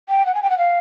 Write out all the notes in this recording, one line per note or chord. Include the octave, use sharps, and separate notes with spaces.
G5
F#5
G#5
G5
F#5
F5